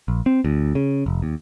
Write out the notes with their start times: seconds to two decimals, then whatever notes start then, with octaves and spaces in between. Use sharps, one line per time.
0.08 A#1
0.26 C4
0.45 D2
0.75 C#3
1.06 F1
1.22 D#2